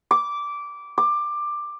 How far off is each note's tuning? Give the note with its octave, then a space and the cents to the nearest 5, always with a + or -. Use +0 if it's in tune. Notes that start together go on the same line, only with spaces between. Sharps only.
D6 -15
D6 +15